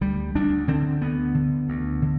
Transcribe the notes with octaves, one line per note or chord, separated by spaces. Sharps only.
D2 G3
D2 D4
D3 C4
D2 B3
D3
D2
D3